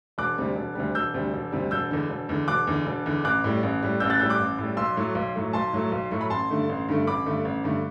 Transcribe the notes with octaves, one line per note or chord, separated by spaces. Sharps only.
E1 D6 F#6
D2 C3 G3
E1
D2 C3 G3
E1 E6 G6
D2 C3 G3
E1
D2 C3 G3
E1 E6 G6
E2 D3
E1
E2 D3
E1 D6 F#6
E2 D3
E1
E2 D3
A1 D6 F#6
A2 G3
A1
A2 G3
A1 E6 G6
F#6 A6
A2 G3 E6 G6
D6 F#6
A1
A2
G3
B1 C6 E6
A2 F#3 A3
B1
A2 F#3 A3
B1 A5 C6
A2 F#3 A3
B1
A2 F#3 A3
B5
A1 A5 C6
G2 D3 A3
A1
G2 D3 A3
A1 B5 D6
G2 D3 A3
A1
G2 D3 A3